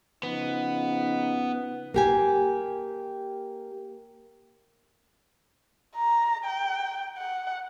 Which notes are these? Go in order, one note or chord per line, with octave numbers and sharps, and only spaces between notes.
C#3 F3 B3 D#4
A#3 G4 G#5
A#5
G5
F#5